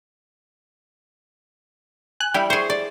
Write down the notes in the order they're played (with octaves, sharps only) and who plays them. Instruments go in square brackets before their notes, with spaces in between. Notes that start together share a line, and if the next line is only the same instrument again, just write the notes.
[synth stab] G#5 F#6
[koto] G3 E4 [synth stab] G5
[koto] G#4 C5 [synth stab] C#6
[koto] D5